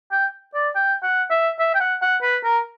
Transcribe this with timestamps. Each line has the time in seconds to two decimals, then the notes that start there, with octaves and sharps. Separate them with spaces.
0.11 G5
0.54 D5
0.75 G5
1.03 F#5
1.30 E5
1.59 E5
1.75 G5
1.80 F#5
2.02 F#5
2.22 B4
2.44 A#4